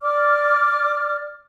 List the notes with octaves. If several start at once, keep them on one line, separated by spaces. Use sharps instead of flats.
D5 D6 F6